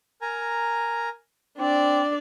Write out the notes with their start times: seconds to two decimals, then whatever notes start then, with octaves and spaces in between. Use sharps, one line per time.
0.22 A#4 G#5 A#5
1.59 C4 D4 D5